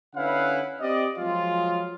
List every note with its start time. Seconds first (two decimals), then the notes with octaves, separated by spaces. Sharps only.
0.15 D3 C#4 E4 B4 F5 F#5
0.80 C4 G4 D5 D#5
1.18 F3 F#3 G#3 F4